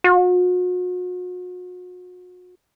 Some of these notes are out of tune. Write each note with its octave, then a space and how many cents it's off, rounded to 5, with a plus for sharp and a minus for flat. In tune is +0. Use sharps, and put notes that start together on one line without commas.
F#4 -40